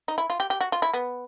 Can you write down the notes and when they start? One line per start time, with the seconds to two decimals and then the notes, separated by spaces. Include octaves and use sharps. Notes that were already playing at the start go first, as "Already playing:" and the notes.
0.08 D#4
0.18 E4
0.30 F4
0.40 G4
0.50 G4
0.61 F#4
0.72 F4
0.82 E4
0.94 B3